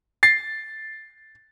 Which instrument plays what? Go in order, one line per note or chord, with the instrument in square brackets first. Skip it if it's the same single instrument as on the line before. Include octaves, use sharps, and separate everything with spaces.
[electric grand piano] A6 C7